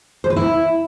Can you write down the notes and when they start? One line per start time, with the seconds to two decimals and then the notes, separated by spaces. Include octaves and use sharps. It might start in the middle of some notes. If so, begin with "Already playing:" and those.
0.24 C5
0.30 B4
0.36 E4